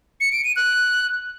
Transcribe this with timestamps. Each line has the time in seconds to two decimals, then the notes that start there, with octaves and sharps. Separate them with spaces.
0.20 C#7
0.32 D7
0.44 D#7
0.56 F#6